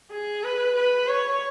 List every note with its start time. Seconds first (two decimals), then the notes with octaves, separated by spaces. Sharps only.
0.11 G#4
0.44 B4
0.76 B4
1.08 C#5